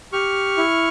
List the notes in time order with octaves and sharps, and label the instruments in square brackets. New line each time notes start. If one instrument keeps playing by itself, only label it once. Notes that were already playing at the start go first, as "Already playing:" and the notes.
[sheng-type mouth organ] G4 C#6 F6
E4